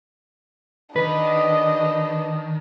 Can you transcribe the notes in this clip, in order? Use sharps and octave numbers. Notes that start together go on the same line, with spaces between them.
D#3 D4 B4 D#5